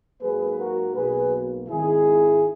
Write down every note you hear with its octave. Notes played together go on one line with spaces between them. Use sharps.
G#2 F#3 A#3 G#4 B4
F#4 A#4
B1 B2 F#3 A#3 G#4 B4
G#1 G#2 D#3 G#3 E4 G#4